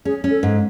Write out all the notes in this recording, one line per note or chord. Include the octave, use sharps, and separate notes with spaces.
C#4 G#4
C#4
A4
G#2